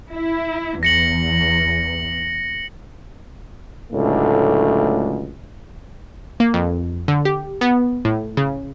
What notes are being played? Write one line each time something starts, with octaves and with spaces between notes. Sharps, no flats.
E4
E2 A#6 C#7 F#7
C#2 A2 D3 F#3 A3
A#3
F2
D3
G4
B3
A2
C#3